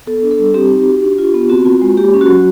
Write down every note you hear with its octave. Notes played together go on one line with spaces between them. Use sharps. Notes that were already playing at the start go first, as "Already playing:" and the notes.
B3 A4
D4
A4
G3
C4 G4
D#4
F#4
D4
F4
B3
C4 F#4
F4
G#3
A#3 G4
C#4
F#4
F#3